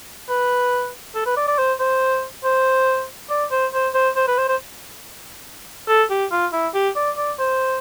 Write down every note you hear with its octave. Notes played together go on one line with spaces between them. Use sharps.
B4
A4
B4
D5
D5
C5
C5
C5
D5
C5
C5
C5
C5
B4
C5
C5
A4
G4
F4
E4
G4
D5
D5
C5